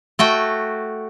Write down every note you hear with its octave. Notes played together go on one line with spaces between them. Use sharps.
A3 F#4 G5